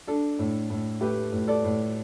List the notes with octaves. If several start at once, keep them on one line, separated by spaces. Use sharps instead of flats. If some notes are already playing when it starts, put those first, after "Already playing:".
D4 A4
A2
A2
A3 G4 B4
A2
A4 D5
A2